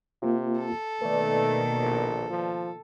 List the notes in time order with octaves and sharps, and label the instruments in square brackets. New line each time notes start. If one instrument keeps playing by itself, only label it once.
[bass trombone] C3 [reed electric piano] A#3 F4
[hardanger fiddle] A4
[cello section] B2 D#3 A#3 [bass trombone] A3 [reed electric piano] B4 D5
[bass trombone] A#1
F3